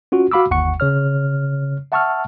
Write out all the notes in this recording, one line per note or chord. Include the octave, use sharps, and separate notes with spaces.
C#4 F4 F#4
F#4 F5 B5 D6 E6
G1 D#2 F#5 C#6 C#7
C#3 C#5 F6
E5 F#5 A5 C#6 E6 F6